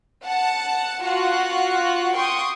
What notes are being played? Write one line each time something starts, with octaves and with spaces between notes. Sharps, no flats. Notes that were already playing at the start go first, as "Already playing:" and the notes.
F#5 A5
F4 F#4 F#5 F#6
G5 C6 C#6 D#6